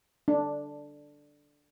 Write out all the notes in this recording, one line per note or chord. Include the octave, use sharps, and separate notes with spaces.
D4